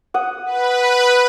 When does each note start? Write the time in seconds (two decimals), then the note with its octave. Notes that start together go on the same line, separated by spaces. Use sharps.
0.14 F#5 D#6
0.46 B4